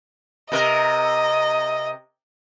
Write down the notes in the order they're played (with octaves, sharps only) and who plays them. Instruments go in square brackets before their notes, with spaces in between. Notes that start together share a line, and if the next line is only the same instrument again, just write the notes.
[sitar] C3 A#4 [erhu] D#5